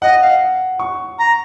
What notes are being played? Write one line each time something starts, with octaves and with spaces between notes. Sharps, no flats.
D#5 F#5
F5
C#6
A#5